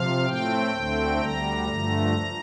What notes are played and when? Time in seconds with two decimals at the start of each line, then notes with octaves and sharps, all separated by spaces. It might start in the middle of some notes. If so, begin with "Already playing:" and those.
Already playing: C3 F3 F5
0.26 A2 A3 C4 G5
0.74 D2 D3 A3 C4
1.21 D2 D3 G3 A#5
1.68 G2 D3 F3 A3